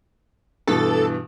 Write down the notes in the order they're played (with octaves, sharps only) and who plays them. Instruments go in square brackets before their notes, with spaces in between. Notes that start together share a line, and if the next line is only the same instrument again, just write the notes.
[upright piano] G2 B2 E3 [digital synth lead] A4